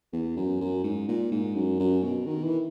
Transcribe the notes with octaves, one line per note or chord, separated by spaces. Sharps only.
E2
F#2
F#2
G#2
A#2
G#2
F#2
F#2
B2
D#3
E3